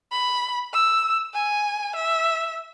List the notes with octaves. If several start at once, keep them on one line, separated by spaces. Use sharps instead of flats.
B5
E6
G#5
E5